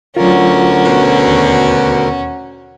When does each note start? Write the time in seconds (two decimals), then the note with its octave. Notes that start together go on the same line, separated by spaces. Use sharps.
0.17 D2 D3 F#3 C#4 F4 F#4 A#4
0.84 B2
1.27 D#2